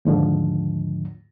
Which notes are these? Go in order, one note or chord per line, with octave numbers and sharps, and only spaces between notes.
D#2 G#2 D3 F3